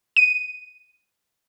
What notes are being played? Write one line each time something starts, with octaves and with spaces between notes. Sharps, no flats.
D#7